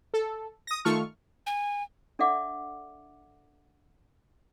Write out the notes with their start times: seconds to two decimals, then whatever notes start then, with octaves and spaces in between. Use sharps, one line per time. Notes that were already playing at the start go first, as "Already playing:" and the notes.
0.14 A4
0.67 D#6 A#6
0.85 D#3 A3 F4 A4 C#6 F6
1.47 G#5
2.19 D4 A4 D5 E5 F#5 D6